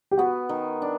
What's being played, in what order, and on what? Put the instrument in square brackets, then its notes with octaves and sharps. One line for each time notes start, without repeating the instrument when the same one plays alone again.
[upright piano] G4
[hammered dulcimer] B3 [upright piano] F#4
[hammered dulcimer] D#3
D4